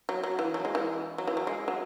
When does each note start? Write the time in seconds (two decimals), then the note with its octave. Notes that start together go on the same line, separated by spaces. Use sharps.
0.09 F#3
0.24 F#3
0.39 E3
0.54 F#3
0.65 G#3
0.75 E3
1.18 F#3
1.27 E3
1.37 F#3
1.47 G#3
1.68 F#3